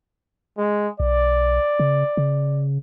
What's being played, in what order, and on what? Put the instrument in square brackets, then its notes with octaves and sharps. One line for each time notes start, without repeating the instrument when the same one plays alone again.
[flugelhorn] G#3
[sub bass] B1 [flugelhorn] D5
[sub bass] C#3
C#3